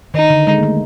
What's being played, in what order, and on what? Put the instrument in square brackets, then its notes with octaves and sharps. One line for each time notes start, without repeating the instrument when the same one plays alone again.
[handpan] D#3 [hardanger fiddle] D#4
[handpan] D3
G#3
A#3
A3